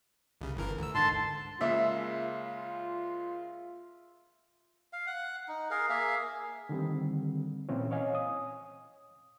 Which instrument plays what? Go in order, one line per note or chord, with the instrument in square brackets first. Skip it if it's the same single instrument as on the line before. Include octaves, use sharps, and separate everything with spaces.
[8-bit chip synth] C2 C#3
G1 E3 A#4
D2 E6
[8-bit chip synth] G#2 D3 [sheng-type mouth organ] A5 C6
[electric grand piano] C#3 G#3 A#3 [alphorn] F4 [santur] E5
[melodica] F5
F#5
D#4
G#4 A#4 F5
A#3 G#4 E5 F5
[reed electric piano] D3 D#3 G3 C4
A#2 E3 C4 C#4
C#5 D#5 F5 G#5
D#6